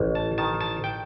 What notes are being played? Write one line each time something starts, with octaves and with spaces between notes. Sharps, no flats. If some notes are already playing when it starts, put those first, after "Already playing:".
Already playing: A1
A5
D#3 A5
A5
G5